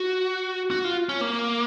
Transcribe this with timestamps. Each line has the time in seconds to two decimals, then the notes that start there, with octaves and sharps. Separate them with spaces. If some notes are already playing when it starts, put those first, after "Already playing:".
Already playing: F#4
0.71 F#4
0.84 F4
1.09 C#4
1.21 A#3